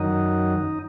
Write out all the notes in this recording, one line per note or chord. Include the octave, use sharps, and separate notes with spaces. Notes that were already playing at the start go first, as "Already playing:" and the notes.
Already playing: F#2 D#3 F#3 D#4